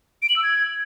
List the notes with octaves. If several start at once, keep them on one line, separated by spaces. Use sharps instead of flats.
D7
F#7
E6
G#6